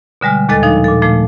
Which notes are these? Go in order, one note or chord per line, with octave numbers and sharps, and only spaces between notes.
B2 D3 G3 G#3 F6
D#2 A#2 G#3 A4 D#5 A6
F3 D4 D#4 A4
A#2 A4
A#2 F3 A3